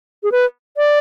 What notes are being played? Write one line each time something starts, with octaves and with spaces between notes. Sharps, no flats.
G#4
B4
D5